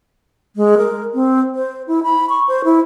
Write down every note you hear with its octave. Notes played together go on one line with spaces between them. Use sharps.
G#3
A#4
C4
C5
E4
B5
C#6
C5
E4